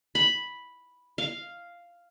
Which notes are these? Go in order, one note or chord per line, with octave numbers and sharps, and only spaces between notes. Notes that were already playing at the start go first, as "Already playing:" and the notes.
B5
F5